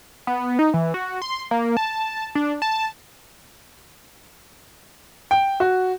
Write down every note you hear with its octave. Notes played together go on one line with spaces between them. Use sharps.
B3
D#4
E3
F#4
C6
A#3
A5
D4
A5
G5
F#4